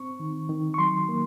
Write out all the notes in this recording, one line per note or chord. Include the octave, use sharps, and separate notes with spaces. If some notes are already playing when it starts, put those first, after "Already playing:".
Already playing: C4 C#6
D#3
D#3
C#6
F#3 C6
A#3